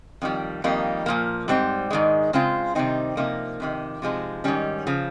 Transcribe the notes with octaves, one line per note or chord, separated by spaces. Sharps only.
F2 D#3 G3
F2 D#3 G3 A#3 D#4
A#2 F3 A#3
G#2 G3 C4
G#2 D#3 G#3
C#3 G#3 C4 F4
C3 D#3 G3 C4 D#4
C3 F3 A#3 D#4
F2 C3 D#3
C3 F3 G#3 D#4
G#2 D#3 G3 C#4
C#3 F3